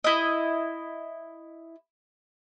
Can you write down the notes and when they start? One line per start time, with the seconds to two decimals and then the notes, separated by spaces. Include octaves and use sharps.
0.04 E4 D#5